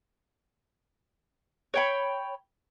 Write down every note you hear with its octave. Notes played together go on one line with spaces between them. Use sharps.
C#5 G5 B5